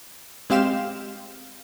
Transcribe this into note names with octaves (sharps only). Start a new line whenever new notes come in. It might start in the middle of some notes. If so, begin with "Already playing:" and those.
G#3 C4 G4 F5 G5 E7